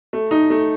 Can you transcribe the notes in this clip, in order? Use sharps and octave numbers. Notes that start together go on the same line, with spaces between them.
A3
D#4
A3